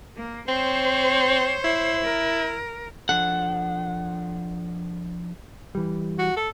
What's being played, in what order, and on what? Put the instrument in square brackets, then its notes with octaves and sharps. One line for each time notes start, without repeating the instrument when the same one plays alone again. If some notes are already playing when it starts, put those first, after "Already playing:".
[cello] A#3
[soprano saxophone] C4 [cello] C5 C#5
[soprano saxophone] E4
[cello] A#4
[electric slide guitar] F3 D4 A4 [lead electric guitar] F#5
[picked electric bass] E3 G3
[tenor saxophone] F#4
A4